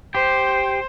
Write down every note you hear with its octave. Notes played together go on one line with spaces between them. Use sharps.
G4 C5